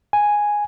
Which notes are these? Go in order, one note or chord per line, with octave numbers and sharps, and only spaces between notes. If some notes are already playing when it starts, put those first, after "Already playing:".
G#5